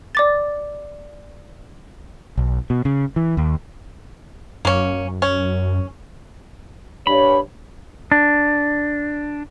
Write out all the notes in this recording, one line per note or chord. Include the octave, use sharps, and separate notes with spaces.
D5 D6 A6
B1
B2
C#3
E3
D#2
F#2 A#3 C#4
C#4
G2 C#5 B5
D4